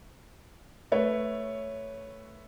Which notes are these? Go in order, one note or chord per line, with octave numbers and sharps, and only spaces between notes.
A3 B4 C#5